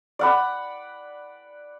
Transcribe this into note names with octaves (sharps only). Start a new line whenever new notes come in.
D5 F#5 B5